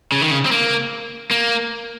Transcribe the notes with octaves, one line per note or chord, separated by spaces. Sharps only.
C#3
D#3
C#3
C4
A#3
A#3